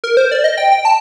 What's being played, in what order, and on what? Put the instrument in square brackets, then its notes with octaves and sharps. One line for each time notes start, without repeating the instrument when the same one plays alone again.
[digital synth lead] A#4
C5
D5
D#5
G5
G5
A5